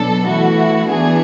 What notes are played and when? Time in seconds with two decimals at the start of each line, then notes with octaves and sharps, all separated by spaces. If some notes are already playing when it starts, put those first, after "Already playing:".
Already playing: B2 F#3 B3 D4 A4
0.27 E3 A3 E4 F#4
0.88 E3 B3 D4 G#4